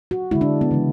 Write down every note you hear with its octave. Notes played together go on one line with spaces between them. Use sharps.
F#4
D3 G#3 E4
D4
B3
C#3 E3 G#3